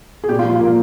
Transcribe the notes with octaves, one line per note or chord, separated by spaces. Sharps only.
G#4
A#2 G4
F4
F3
F4
A#2 A#3